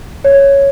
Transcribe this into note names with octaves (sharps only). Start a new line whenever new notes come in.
C#5